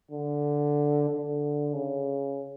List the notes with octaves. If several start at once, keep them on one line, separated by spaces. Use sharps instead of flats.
D3
D3
C#3